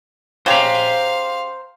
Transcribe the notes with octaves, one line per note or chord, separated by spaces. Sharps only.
C#3 G4 C5 F5 A#5